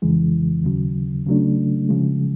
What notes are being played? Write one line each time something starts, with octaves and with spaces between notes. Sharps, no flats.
F2 C#3 E3 G#3
D#2 C#3 F#3
C#3 F#3 A3 D4
C#3 F3 G#3